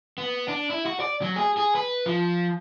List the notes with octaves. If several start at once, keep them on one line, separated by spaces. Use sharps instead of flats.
B3
D4
E4
F#4
D5
F#3
G#4
G#4
B4
F3